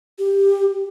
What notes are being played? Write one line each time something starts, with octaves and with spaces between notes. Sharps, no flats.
G4